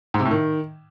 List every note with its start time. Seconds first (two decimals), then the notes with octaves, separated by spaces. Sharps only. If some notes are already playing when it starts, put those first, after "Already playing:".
0.14 G#2
0.20 C3
0.25 A2
0.31 D#3